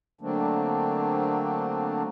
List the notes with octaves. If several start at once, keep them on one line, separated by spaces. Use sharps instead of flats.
D3 F#3 A3 A#3 C4 D4